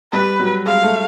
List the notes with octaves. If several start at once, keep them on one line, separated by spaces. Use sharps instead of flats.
G3 B4
F#3
G#3 F5
A3